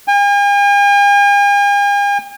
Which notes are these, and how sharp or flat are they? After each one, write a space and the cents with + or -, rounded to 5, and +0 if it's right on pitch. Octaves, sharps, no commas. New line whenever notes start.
G#5 -45